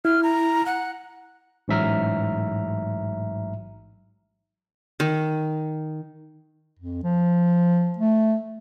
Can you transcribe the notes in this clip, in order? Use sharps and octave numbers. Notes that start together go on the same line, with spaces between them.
E4 F6
A#5
F#5
A1 G#2 F#3 E5 A#5 F6
D#3
F2
F3
A3